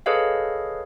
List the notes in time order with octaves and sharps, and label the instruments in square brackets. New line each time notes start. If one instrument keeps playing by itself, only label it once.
[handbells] G#4 A4 B4 C#5 D#5 F5